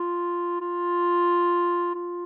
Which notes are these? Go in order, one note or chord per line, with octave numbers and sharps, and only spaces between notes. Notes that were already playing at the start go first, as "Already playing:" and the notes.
Already playing: F4
F4
F4